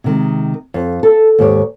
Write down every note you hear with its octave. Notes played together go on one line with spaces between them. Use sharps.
C3 D#3 G#3
F2
A4
D#2 G#2 G4 C#5